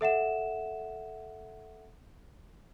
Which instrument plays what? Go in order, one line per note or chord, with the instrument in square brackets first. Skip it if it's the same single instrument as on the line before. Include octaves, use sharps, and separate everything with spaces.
[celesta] A4 E5 F#5 E7